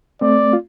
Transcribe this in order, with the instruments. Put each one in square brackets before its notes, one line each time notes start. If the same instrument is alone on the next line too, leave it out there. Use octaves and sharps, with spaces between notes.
[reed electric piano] A3 C4 [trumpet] D5
[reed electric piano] F4